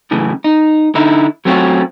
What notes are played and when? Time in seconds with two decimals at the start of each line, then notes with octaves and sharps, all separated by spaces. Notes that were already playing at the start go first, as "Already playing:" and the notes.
0.11 F#2 A2 C#3 E3
0.44 D#4
0.95 D3 D#4 E4
1.45 F#3 A3 C4 C#4 F4 F#4